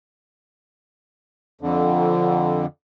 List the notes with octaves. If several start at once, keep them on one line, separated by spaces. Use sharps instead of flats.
F2 D3